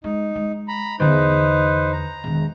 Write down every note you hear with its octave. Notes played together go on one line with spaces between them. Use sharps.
G#3 D#4
G#3
A#5 B5
E2 D3 D#4 B4 C5
A#5
E1 D#3